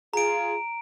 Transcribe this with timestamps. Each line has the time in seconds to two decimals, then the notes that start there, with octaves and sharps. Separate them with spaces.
0.13 F4 G#4 A#5 D7